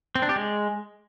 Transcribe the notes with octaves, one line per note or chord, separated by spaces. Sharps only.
C4
D4
G4
G#3